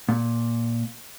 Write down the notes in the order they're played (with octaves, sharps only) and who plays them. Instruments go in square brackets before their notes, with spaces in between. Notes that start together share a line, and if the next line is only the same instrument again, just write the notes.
[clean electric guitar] A#2